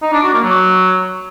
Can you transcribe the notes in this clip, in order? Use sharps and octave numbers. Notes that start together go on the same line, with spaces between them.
D#4
D4
F#4
A#3
F#3